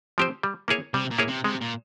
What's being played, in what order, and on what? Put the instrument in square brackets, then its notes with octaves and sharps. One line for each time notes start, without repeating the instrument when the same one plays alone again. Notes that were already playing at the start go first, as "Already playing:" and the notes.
[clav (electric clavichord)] F3 C4 G4 C5
G3
A#3 E4 G#4 C#5
[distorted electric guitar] C3 [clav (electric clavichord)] G3
[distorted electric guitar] A#2
[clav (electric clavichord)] A#3 E4 G#4 C#5
[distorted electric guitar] C3
[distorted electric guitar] C3 [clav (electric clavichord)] G#3
[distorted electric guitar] A#2